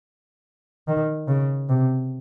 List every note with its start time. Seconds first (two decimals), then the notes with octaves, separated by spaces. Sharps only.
0.88 D#3
1.28 C#3
1.69 C3